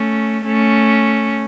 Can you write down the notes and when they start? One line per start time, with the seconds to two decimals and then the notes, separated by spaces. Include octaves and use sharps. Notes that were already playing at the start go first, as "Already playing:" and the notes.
Already playing: A3 C#4
0.45 A3 C#4